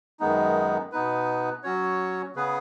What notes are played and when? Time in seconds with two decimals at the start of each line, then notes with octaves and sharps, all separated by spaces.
0.20 F#2 D#3 G#3 B3 D#4
0.92 B2 B3 D#4 B4
1.64 F#3 C#4 F#4 C#5
2.36 C#3 B3 G#4 B4